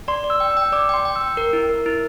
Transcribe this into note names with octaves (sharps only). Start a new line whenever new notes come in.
D5 C6
D5
E6
G5
E6
G5
D5 D6
G5 C6
G5
E6
G5
A#4
E4
A#4
E4